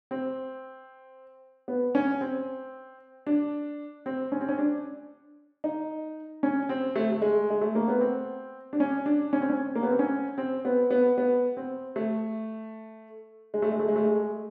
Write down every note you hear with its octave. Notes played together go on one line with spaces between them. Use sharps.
C4
B3
C#4
C4
D4
C4
C#4
C4
C#4
D4
D#4
C#4
C4
A3
A3
G#3
G#3
A3
A#3
B3
C4
D4
C#4
D4
C#4
C4
C#4
A#3
B3
C4
C#4
C4
B3
B3
B3
C4
A3
G#3
A3
G#3
A3
G#3
A3
G#3